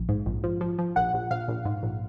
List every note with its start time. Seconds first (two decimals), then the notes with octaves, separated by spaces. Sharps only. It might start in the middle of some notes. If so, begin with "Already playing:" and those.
Already playing: A#1
0.09 G#2
0.26 A#1
0.44 F3
0.61 F3
0.79 F3
0.96 A#1 F#5
1.14 A#1
1.31 A#1 F5
1.48 A#1
1.65 G#2
1.83 A#1